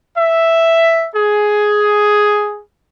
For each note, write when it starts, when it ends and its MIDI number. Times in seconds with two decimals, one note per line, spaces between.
0.17 1.08 76
1.14 2.61 68